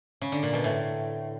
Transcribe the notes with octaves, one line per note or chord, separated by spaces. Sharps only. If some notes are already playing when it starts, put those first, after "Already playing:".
C#3
D3
A#2
B2
A2